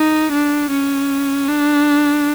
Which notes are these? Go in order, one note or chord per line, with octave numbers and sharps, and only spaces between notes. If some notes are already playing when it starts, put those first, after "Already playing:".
Already playing: D#4
D4
C#4
D4